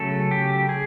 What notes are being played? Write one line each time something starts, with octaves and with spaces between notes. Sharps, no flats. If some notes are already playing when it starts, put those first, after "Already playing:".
Already playing: C#3 F#3 A3 C#4 A4
G4
G#4